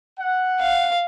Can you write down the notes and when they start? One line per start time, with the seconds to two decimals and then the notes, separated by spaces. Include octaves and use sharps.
0.19 F#5
0.61 F5